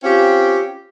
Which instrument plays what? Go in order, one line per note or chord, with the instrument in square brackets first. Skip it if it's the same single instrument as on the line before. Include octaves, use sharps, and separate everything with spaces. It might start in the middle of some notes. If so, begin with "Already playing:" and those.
[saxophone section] C4 C#4 F4 G4